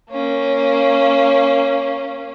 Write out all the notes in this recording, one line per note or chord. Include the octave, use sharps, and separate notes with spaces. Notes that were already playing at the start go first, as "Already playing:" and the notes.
A#3 C#4